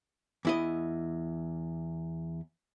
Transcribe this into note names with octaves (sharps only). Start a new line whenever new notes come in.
E2 E4 D#5